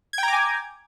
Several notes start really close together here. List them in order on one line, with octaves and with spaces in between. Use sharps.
G#6 G5 A#5 D6 G#5